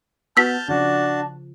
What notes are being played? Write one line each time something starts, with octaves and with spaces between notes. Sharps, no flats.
B3 F#4 A5 E6 F6 G6 B6
C#3 F3 D4 F#4 A5